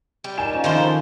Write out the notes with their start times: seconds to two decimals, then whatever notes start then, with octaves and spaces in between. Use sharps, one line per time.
0.24 G3
0.38 D#3 G#5 E7
0.53 F3 A#3 C#4
0.64 D3 D#3 F3 E4 C5 C#5 A5 B5